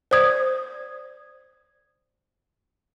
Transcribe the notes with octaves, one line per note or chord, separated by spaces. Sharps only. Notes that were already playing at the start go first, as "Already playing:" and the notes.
C5 D5 D#6 G#6